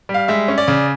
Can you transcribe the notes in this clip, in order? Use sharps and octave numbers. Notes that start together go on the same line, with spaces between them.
G3
F5
G#3 E5
C#4
D5
C#3